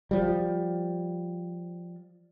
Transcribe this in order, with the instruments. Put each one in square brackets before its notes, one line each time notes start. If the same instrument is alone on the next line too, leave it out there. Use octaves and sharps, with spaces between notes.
[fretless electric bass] F3 G3